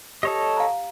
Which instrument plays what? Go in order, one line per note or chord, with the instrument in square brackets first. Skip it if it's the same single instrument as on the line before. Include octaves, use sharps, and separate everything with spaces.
[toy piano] G4 [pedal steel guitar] A4 C#5 D#5
[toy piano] F5 A#5